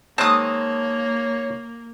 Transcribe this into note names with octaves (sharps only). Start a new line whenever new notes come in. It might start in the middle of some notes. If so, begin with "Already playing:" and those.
D#3 G#3 A#3 C4 C#5 A5 D#6